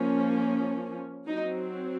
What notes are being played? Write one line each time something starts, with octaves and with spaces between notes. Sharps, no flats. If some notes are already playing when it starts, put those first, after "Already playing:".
Already playing: F3 A#3 C#4
F#3 C4 D#4